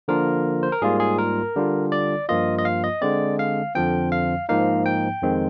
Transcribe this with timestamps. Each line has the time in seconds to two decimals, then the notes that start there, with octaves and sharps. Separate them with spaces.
0.08 D3 F3 A#3 D4 F4 A#4
0.63 C5
0.72 A#4
0.82 G#2 G3 A#3 F4 G#4
1.00 G#4
1.18 A#4
1.56 D3 G3 D4 F4
1.92 D5
2.29 G2 F3 A#3 F4 D#5
2.58 D#5
2.65 F5
2.84 D#5
3.01 D3 G#3 C4 D5
3.39 F5
3.75 F2 D3 F3 C4 G5
4.12 F5
4.49 G#2 F3 A#3 D#4 F5
4.86 G5
5.22 F2 D#3 G#3 C4